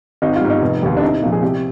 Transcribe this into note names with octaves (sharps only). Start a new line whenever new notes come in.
G#1 D#4
F4
G#2 G3
D#4
F1
D#2 D#3 G3
D4
C2 D#4
A#2 F3
G#4
C2 G4